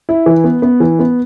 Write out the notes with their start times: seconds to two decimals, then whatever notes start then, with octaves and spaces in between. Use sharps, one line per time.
0.09 E4
0.26 E3
0.44 B3
0.62 B3
0.80 E3
0.99 B3